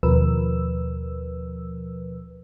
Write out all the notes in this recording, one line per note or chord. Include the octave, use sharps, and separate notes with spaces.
D#2 B2 F3 A#4 B4 E6